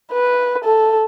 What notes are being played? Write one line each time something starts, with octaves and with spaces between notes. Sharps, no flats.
B4
A4